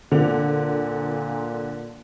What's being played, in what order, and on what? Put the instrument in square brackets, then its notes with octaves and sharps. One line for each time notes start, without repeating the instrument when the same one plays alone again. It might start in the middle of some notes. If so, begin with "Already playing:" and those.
[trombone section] A#2 [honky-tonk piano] D3 C4 F7